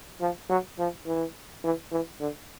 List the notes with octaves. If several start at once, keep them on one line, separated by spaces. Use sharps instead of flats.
F3
F#3
F3
E3
E3
E3
D3